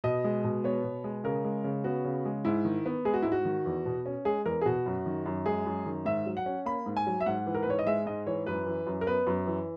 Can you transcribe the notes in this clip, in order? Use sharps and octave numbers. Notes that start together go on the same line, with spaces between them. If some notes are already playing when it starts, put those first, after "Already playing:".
B2 D#5
G#3
B2
B3 C#5
B2
G#3
C#3 A#4
G#3
C#3
B3 F#4
C#3
G#3
G#2 E4
D#3
B3
G#3 G#4
F#4
G#2 E4
F#4
D#3
E2
B2
C#4
G#3 G#4
E2 A#4
G#4
B2 F#4
F#2
D#3
F#2
G#3 G#4
F#2
D#3
G#2 E5
F#3
F#5
C#4
A#3 B5
G#2
G#5
F#3
E5
G#2 F#5
E3
A#4
B4
G#2 C#5
D#5
G#3 E5
G#2 D#5
E3 C#5
F#2 B4
E3
F#2
A#4
B3 B4
F#2
E3